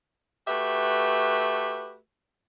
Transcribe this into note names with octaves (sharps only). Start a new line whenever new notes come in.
A3 F#4 G4 B4 E5